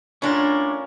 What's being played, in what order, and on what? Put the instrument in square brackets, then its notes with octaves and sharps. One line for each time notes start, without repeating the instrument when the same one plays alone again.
[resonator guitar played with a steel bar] A2 D4 [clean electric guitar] C#4 F4 A#4